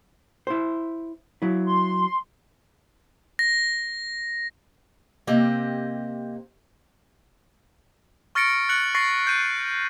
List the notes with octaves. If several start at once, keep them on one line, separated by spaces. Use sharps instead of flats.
E4 C5
F#3 E4
C6
A#6
C3 A#3 C4 G4 D#5
C#6 F6 A6 A#6 C#7 D7
F#6 C#7 F#7
C#6 A6 A#6 C7
G6 D#7